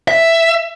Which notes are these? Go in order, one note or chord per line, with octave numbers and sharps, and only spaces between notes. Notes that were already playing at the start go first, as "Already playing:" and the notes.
E5